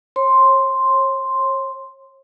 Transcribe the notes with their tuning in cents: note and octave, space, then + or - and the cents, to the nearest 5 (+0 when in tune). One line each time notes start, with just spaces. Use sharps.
C#5 -40 C6 +0